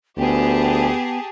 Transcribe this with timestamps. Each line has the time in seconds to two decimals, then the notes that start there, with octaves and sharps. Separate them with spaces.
0.18 D2 B3 G4 G#4 A5